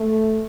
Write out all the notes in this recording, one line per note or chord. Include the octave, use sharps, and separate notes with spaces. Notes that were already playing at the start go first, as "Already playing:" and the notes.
Already playing: A3